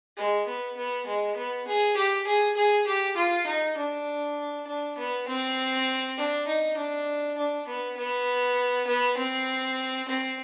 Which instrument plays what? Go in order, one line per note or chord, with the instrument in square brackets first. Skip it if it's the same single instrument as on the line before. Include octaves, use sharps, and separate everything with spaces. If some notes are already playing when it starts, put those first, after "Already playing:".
[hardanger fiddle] G#3
B3
B3
G#3
B3
G#4
G4
G#4
G#4
G4
F4
D#4
D4
D4
B3
C4
D4
D#4
D4
D4
B3
B3
B3
C4
C4